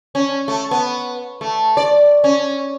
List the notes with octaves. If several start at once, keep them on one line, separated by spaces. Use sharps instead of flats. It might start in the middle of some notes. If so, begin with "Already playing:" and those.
C#4
A3
B3
A3
D5
C#4